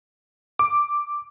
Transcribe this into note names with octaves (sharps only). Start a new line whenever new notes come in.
D6